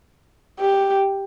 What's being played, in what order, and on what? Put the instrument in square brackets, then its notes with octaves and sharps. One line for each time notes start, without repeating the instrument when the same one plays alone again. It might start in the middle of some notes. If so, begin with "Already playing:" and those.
[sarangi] G4